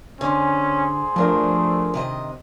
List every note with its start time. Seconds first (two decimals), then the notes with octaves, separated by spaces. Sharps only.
0.21 D3 C#4 G#4 C5
1.16 G2 F3 A3 D4 A#4
1.94 C3 D#3 D#5